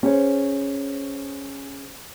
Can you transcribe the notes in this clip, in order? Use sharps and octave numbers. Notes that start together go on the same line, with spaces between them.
C#4 G#4 C5 C#5